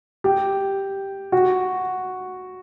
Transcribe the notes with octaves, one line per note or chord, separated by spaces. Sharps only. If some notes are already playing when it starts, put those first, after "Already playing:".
G4
F#4